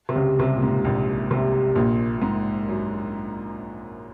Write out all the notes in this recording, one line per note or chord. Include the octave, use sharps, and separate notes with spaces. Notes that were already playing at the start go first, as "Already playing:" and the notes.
C3
C#2 C#3
C2 C3
A#2
G#2
A#1 A#2
C2 C3
A#1 A#2
A#2
G#2
F#2